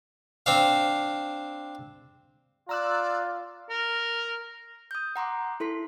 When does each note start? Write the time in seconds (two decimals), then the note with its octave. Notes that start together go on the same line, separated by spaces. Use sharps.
0.46 C4 D4 F5
2.69 F4 D5 A#5 E6 F#6
3.70 A#4
4.91 D#6 G6
5.16 F#5 A#5 C6 D6
5.60 E4 A4 C6 B6